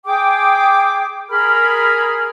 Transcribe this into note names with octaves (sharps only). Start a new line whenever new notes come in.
G#4 G5 D6
G#4 A#4 B5 F6